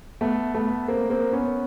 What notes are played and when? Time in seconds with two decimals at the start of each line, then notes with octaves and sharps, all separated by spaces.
0.21 A3 B3
0.55 A3 B3
0.88 A#3 C4
1.10 A#3 C4
1.33 B3 C#4